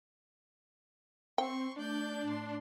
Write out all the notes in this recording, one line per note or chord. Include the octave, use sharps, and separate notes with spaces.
C4 G5 C6 C#6
A3 D4 D5 G6
A2 C6